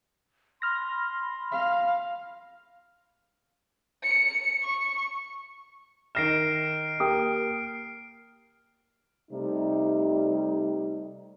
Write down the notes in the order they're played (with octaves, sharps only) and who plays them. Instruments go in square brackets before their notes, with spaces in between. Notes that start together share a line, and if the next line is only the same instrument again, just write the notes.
[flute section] B5 C6 [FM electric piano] F6 A#6
[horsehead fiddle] F5
[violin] C#7
C#6
[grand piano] D#3 A#6 E7 [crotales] F6 C7 D7
[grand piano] A#3 G4 D#6
[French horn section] C3 G3 A3 D#4